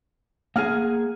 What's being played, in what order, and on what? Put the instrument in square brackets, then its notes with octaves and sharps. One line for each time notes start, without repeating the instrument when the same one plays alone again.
[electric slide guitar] A#3 G#4 [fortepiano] F#5 F6